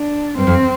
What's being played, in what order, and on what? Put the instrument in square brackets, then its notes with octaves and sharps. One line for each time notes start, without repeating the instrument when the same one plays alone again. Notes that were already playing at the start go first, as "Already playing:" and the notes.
Already playing: [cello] D4
[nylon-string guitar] G2 [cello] C4
[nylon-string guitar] F2